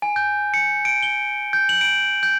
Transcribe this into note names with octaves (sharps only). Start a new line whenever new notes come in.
G#5
G6
C#7
D7
G7
G6
F#7
D7
G6